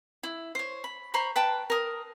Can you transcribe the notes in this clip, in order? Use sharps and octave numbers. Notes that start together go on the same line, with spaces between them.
E4
C5 C#5
B5
C5 A#5 B5 C#6
B4 G5 A5
A#4 D#6